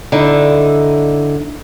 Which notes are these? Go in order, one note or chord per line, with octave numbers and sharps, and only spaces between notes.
D3 D#4 E4